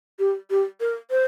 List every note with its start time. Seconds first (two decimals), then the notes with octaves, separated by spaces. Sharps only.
0.19 G4
0.50 G4
0.80 A#4
1.10 C5